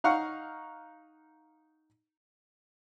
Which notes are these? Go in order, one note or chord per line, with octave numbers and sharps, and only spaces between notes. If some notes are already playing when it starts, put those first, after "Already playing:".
D#4 F5 F#5 C#6